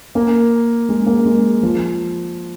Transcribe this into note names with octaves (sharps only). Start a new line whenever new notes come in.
A#3
G#3
A#3
G#3
F3